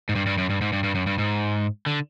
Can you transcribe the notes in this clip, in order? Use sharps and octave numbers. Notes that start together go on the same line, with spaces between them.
G#2
G2
G2
F#2
G2
G#2
G2
G2
F#2
G2
G#2
D3